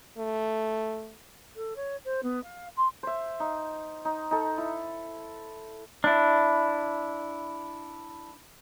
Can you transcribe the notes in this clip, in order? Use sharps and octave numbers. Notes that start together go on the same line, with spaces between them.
A3
A4
C#5
C5
B3
F5
C6
C5 E5
D#4
D#4
D#4 A4
E4
D4 E4